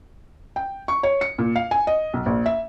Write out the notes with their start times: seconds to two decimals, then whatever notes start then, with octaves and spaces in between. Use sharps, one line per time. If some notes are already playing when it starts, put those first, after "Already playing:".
0.56 G5
0.88 C#6
1.03 C#5
1.21 C#7
1.38 A#2
1.56 F5
1.71 G#5
1.87 D#5
2.13 B1
2.26 A#1
2.46 E5